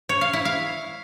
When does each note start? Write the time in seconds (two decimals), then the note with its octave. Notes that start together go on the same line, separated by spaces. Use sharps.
0.09 C#5
0.21 F5
0.33 E4
0.45 F5